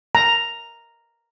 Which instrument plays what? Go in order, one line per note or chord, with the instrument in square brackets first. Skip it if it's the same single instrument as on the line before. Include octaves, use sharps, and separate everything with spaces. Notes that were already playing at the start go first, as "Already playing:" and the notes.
[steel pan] A#5